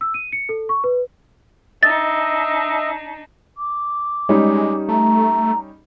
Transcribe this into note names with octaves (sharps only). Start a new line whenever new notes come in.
E6
D#7
C#7
A4
C#6
B4
D4 D#4 D#5 E5 A6
D6
G3 G#3 C#4 D#4
A3 A#5